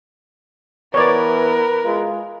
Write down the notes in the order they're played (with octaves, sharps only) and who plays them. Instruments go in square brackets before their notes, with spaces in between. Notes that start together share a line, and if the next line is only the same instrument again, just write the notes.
[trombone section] E3 B3 [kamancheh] A#4 B4 [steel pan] C#5 D5
[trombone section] G#3 F4